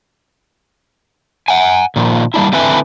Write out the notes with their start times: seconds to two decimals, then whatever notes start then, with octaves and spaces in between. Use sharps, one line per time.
1.48 F#5 G#5
1.96 A#2 D#3 F3
2.34 G3 A#3 D4 E4
2.52 D3 A3 C4 E4 B4 G#5